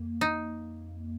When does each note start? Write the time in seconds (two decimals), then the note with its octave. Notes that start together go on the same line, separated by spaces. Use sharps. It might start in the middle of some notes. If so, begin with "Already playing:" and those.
Already playing: F2 A#3
0.21 D#4